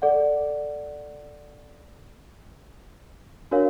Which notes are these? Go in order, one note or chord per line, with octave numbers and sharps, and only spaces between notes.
A4 D5 F#5
D4 F#4 A#4 C#5 F5